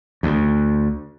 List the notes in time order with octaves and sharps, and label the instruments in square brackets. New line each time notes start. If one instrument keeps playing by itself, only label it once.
[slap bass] D2